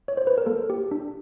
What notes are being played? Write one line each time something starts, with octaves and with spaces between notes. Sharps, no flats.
C#5
C5
B4
A#4
A#3 A4
G4
D4